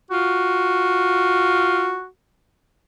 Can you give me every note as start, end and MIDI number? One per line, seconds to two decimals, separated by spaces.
0.11 1.98 65
0.11 2.07 66